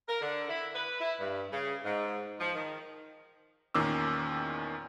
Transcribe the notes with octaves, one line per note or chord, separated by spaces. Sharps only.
A#4
D3
E4
B4
E4
G2
C#3
G#2
F3
D#3
E2 A#2 D#3 C#4 D6 E6